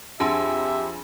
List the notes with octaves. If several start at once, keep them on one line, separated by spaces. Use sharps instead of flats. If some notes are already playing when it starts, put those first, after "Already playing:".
F2 D4 G4 G#4 E5 G#5 A5 C6